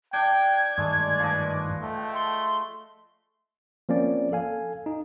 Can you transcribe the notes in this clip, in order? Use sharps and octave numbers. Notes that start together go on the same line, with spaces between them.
D4 D5 G5 G#6
G2 D#3 G#3 A3 D5
F3 B4 D#5
A3 G5
C6
F3 A#3 C4 C#4 D5
A4 F5 G#5
D#4